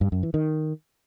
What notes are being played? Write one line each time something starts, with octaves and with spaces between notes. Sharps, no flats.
G2
F#2
E3
D#3